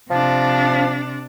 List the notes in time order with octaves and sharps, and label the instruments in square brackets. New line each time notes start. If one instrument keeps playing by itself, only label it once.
[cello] C3 D4 [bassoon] F3